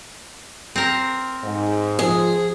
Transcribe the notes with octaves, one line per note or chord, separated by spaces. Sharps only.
C4 A#4
G#2
F3 G#4